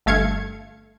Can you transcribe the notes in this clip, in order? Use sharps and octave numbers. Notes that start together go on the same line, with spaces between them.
G1 A3 F5 G#6 C#7